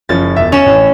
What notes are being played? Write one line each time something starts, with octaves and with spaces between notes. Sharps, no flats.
F#1 F3 C#4 A6
E1 E5
C#4 E7 F7
A1